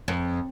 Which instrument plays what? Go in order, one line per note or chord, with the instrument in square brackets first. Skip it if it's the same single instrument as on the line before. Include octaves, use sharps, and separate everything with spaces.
[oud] F2